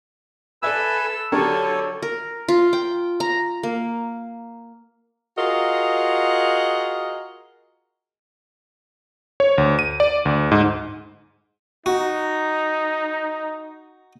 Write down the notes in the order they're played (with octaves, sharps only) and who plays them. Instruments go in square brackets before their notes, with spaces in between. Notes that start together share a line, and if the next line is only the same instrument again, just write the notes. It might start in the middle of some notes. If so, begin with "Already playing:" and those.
[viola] A4 [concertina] B4 G#5 B5 [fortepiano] D5 E5 [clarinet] E6
[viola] D3 F#3 [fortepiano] D4 G4 A#4 [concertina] A4 C#5
[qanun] A#4
F4
G5
A#5
A#3
[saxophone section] F4 F#4 G#4 A#4 D#5
[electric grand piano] C#5
D2
D#7
D5
D2
G#2
[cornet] D#4 [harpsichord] F#4